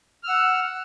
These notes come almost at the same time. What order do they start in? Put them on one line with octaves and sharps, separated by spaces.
F6 E6 F#5